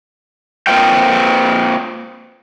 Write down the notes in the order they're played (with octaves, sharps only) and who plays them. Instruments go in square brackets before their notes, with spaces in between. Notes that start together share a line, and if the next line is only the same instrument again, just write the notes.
[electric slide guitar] A#3 C4 F4 C5 F5 G5